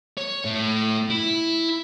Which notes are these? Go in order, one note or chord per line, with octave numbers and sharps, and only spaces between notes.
C#5
A2
E4